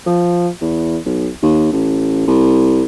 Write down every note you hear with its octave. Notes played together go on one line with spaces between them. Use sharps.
F3
E2
B1
D#2
A1
C2